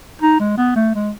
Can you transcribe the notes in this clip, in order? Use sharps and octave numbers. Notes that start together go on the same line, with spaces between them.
D#4
G#3
B3
A3
G#3